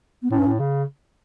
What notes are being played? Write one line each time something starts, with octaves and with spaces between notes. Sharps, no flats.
B3
A2 C#4
G2
A2
C#3